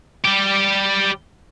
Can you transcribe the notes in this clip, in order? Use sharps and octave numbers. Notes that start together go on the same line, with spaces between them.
G3 G4